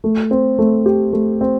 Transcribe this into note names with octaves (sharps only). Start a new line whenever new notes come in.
A3
C4
A3
G4
A3
C4